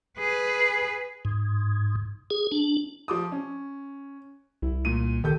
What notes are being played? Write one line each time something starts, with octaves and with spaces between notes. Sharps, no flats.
G#4 B4
G#2
G#4
D4
F3 D6 D#6
C#4
C2 E4
A#2 D#7
D#3 G4 A4 G6